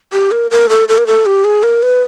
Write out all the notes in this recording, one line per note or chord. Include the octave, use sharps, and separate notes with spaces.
G4
A#4
A#4
A4
A4
A#4
A4
G4
G#4
A#4
B4